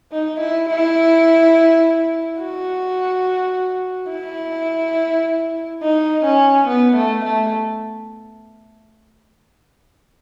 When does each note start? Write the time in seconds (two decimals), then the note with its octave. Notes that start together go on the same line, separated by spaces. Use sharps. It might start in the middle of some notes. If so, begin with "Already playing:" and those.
0.12 D#4
0.40 E4
0.69 E4
2.40 F#4
4.11 E4
5.83 D#4
6.25 C#4
6.68 B3
6.97 A3
7.25 A3